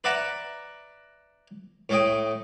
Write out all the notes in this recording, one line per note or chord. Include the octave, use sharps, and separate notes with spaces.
B4 D5 E5 F#5 A#5 B5
A2 A3 D#5 G5